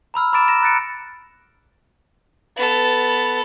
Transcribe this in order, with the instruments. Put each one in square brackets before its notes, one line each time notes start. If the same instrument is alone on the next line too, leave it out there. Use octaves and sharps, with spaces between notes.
[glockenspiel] A#5 B5 E6 F6
A#5 B5 D6 A6 D7 E7
A#5 A#6 E7
A#5 F#6 A6 C#7 D7
[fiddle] B3 A4